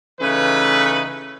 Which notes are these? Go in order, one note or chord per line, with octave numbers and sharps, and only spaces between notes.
C#3 E3 A3 C#4 D#4 B4